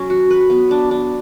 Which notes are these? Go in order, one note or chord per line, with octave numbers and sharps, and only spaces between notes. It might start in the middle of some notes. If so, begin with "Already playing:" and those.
Already playing: F#3 C#4
F#4
B4
B3
D4
D4